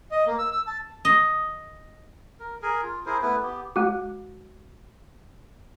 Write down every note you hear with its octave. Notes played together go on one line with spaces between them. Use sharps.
D#5
A#3
E6
E6
A5
D#5
A#4
G#4 A#4
F4
E4 G#4 A#4 C5
A3 B3 E4 B4
B3 G4
G#3 F#4